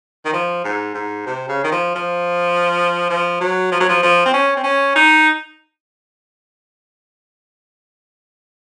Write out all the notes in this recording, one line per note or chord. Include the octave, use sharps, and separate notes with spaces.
D#3
F3
G#2
G#2
C3
C#3
D#3
F3
F3
F3
F#3
F3
F#3
F3
F3
C4
C#4
C4
C#4
D#4